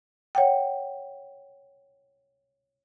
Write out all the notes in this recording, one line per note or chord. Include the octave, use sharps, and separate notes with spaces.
C#5 F#5 G5